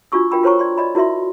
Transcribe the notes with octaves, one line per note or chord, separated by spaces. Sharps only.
D4 F4 F#4 C#6 E6
F4 A#4 G5 B5 E6
F4 A#4 C5 C#5 A#5 C#6
D5 C6
D5 D#5 B5
E4 F#4 A#4 E5 C6